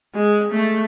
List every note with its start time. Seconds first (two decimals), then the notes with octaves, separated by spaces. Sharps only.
0.15 G#3
0.52 A3